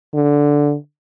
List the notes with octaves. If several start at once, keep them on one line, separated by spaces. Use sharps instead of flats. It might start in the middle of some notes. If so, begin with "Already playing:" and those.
D3